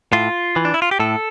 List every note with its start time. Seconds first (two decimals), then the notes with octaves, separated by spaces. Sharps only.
0.13 A2 F4
0.56 E3
0.65 D4
0.74 E4
0.82 F4
0.91 G4
0.99 A2 A4